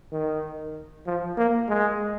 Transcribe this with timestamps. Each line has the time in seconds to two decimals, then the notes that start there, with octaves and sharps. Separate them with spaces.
0.12 D#3
1.06 F3
1.38 A#3
1.69 G#3